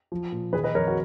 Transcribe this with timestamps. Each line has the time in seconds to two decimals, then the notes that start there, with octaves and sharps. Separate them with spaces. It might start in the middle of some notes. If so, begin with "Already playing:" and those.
0.12 F3
0.32 A#2
0.53 D#3 G#4 B4
0.64 B4 D#5
0.75 F2 A#4 C#5
0.88 F#4